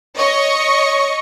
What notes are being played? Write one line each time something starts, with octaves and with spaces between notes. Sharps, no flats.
C#5 D#5 C#6